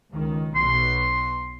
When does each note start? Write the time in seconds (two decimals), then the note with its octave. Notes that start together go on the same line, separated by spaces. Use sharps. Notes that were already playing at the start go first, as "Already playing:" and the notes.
0.11 C#2 D#3
0.56 B1 B2 C6